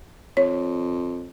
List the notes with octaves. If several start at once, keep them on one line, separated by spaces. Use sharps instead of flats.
F2 C#5